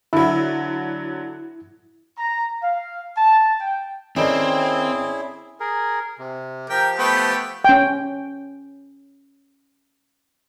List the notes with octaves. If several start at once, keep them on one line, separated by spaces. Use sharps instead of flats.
D3 F#3 E4
A#5
F5
A5
G5
D#3 C4 C#4 E4 G#4 A4 D5
G#4 A#4
C3
F3 G4 A#4 G5
A3 B3 G5
C#4 G5